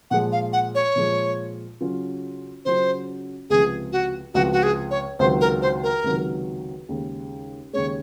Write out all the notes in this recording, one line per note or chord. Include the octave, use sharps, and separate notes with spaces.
A#2 F3 G#3 F#5
F5
F#5
C#5
A#2 F3 G#3
C#3 F#3 C#4 F4
C#3 F#3 C#4 F4 C5
C#2 C3 F3 G#4
F#4
C#2 C3 F3 F#4
F#4
G#4
C#5
C#2 C3 D#3 F#3 C5
A#4
C5
A#4
C#2 C3 D#3 F#3
D#2 C#3 G#3
D#2 C#3 G#3 C#5